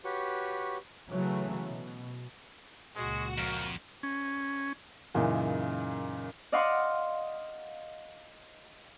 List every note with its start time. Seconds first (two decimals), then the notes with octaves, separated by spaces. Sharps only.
0.05 F#4 G4 B4 C#5 C#6
1.09 C#3 E3 F#3 A3
1.68 B2
2.96 C#2 A#2 G#3 F#4
3.38 F2 A#4
4.03 C#4
5.14 F#2 A#2 C#3 E3 D#4
6.52 D5 D#5 F5 F#5 C6 C#6